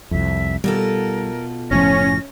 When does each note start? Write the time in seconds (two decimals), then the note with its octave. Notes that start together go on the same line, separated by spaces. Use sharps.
0.11 C2 F2 E5
0.64 B2 G3 F4 A4 A#4
1.71 F#1 A2 F3 C#4 A#6